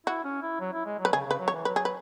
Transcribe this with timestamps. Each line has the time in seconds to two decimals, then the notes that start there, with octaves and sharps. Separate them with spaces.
0.07 E4 F#4
0.24 C#4
0.42 E4
0.60 F#3
0.73 E4
0.86 G#3
0.99 F#3
1.05 B4
1.13 C#3 G#4
1.26 C#3 B4
1.39 F#3
1.48 C#5
1.53 E3
1.65 F#3 B4
1.76 G#4
1.85 B4